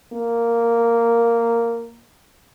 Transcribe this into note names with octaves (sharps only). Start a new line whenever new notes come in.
A#3